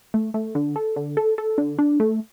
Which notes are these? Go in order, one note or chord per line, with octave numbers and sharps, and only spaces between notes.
A3
A3
D3
A4
D3
A4
A4
D3
D4
A3